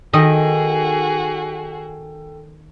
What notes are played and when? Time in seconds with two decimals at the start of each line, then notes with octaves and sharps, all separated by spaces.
0.13 D#3 F#4 G#4 A4 D#5 G5